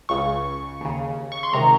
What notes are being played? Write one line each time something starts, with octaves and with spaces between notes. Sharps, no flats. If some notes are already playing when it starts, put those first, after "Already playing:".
C#2 C#3 C#6
D#2 C#3
C#6
C6
C#2 C3 D#3 A#5